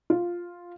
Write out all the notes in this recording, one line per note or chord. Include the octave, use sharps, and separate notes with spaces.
F4